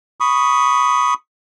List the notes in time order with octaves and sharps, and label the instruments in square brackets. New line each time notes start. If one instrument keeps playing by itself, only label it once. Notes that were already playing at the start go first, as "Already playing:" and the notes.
[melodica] B5 C#6 D#6